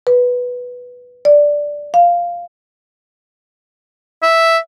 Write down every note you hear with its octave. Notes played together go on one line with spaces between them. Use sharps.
B4
D5
F5
E5